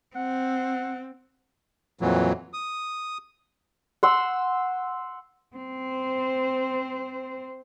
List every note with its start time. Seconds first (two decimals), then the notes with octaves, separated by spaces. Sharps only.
0.16 C4 F#5
2.01 F2 A#2 E3 F#3
2.53 D#6
4.03 F#5 C6 E6
5.56 C4 C5